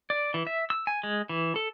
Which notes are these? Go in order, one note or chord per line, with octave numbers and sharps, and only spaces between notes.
D5
E3
E5
E6
G#5
G#3
E3
A4